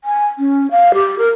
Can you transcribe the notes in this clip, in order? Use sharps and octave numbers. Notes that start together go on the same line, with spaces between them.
G#5
C#4
F5
G4
A#4